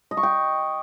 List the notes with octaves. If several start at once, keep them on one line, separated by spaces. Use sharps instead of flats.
D#5
C#6
G5